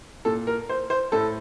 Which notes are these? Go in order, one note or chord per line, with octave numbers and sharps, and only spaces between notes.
A#2 A4
A#4
C5
C5
A2 A4